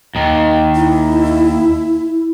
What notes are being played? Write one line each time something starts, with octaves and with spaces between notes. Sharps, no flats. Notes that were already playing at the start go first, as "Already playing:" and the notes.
D#2 D#3
E4